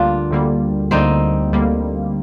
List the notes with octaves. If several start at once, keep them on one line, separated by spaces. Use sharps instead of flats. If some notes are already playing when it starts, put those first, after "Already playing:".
Already playing: D2 D3 G3 A#3 D4 F4
D2 D3 G3 A#3
D2 D3 G3 A#3 C4 D#4
D2 D3 G3 A#3